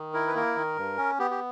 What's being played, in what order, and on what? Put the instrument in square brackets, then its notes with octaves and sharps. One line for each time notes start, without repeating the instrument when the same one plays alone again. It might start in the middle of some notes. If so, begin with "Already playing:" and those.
Already playing: [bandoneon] D#3
E4 A#4
B4
A#3 A#4
D#3
G2
C#4
B3 G4
G4